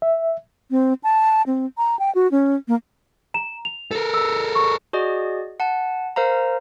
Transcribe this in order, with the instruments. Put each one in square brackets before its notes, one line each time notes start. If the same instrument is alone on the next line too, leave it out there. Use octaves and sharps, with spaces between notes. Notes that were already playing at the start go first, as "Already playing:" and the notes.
[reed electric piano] E5
[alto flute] C4
A5
C4
A#5
G5
F#4
C#4
A#3
[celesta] A#5 E7
F7
[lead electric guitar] A4 A#4
[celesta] E6
C#6
[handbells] F#4 G#4 D5 D#5
F#5 A5
A#4 C5 F5 A#5